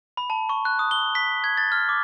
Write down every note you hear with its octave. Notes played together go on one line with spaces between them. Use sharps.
B5
A5
C#6
F#6
D#6
G7
B6
G#6
A6
F6
D6